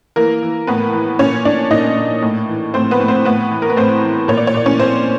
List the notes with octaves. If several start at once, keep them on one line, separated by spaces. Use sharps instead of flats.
E3 A#3 A#4
E3
A2 B3 B4
E3
A#2 C#4 C#5
A#2 D4 D5
A#2 D#4 D#5
A#2
A2
E3
A2 C4 C5
B3 B4
A2
C4 C5
A2 B3 B4
E3
A#4
B4
A2 C4 C5
E3
A#2 C#5
D5
C#5
A#2 D5
C#4 C#5
A#2 C4 C5